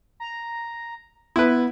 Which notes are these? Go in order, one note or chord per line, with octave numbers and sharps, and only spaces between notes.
A#5
B3 E4 B4